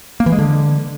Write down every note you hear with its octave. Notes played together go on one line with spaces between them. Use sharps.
A#3
E3
G#3
D3